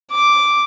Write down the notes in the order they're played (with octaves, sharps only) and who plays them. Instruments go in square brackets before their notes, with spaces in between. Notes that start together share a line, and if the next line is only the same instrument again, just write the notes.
[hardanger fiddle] D6